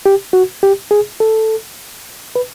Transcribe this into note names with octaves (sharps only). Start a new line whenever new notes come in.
G4
F#4
G4
G#4
A4
B4